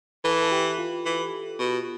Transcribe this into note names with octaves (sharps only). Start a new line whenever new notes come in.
E3 A4
A4
G4
F4
E3
B2